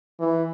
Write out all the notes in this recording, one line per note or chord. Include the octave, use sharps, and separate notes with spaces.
E3